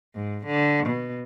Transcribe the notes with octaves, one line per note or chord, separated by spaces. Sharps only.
G#2
D3
B2